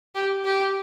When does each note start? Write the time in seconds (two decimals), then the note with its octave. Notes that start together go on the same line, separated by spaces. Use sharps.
0.15 G4
0.44 G4